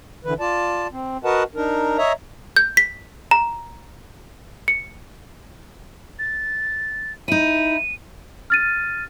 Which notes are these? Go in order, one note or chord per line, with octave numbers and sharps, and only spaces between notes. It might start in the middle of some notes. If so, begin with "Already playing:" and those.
D3 E3 B4
F4 D5 A5
C4
F#4 A#4 B4 D#5 F#5 A5
D4 D#4 A#4
C#5 D#5 E5 A#5
G6
B6
A#5
C#7
A6
D#4 E4 D#7
F6 A6 D#7